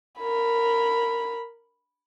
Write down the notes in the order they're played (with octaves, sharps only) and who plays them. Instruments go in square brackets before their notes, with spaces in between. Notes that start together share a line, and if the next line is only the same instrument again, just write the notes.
[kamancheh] A#4 B5